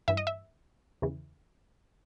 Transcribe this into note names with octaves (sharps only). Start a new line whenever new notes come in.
G2 E3 E5
D#5
E5
E2 C#3 E3